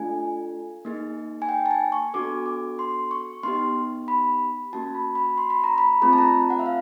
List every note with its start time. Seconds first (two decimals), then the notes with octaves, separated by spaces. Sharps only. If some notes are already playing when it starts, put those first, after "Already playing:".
Already playing: A3 D4 F4 A4 G#5
0.85 A#3 D#4 G#4
1.42 G#5
1.49 G5
1.66 A5
1.71 G#5
1.92 C#6
2.14 B3 D4 F#4 A4 D6
2.46 D6
2.79 C6
3.11 C#6
3.43 B3 D#4 G4 C6
4.08 B5
4.73 A#3 C#4 F#4 A5
4.95 B5
5.15 B5
5.38 C6
5.50 B5
5.64 A#5
5.78 B5
6.02 A3 C4 F4 G#4 B5
6.13 A5
6.18 A#5
6.50 F#5
6.59 E5
6.66 F5